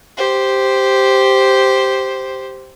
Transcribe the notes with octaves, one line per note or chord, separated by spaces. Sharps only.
G4 C5